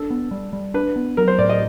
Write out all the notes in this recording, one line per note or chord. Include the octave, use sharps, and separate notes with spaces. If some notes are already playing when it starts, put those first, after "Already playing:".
Already playing: D4 A4
B3
G3
G3
D4 B4
B3
F#3 A#4
C5
A2 D5
D#5